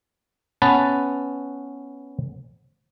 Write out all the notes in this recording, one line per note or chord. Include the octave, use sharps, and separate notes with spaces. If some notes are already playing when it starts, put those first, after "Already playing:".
B3 C#4 B4 A5